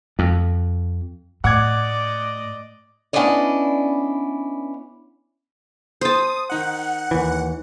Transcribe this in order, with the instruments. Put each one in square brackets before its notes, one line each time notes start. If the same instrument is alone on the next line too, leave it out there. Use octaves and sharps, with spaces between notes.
[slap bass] F2
[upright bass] A2 [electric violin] D5 D#5 [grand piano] F#5 D6 G#6
[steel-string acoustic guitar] B3 C#4 D4 E4 D5 D#5
[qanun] C5 A5 [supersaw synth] D#6
[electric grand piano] D#3 D#4 F#6 [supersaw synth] F#5
[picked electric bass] D#2 E3